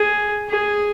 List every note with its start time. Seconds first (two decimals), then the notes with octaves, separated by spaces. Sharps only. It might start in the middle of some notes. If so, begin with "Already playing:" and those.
Already playing: G#4
0.49 G#4